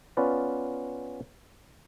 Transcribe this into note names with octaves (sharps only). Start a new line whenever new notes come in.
B3 C#4 F4 B4 D5